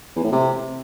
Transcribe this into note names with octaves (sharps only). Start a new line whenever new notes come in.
E2
A2
C3